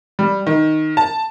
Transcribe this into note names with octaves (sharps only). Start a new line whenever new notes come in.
G3
D#3
A5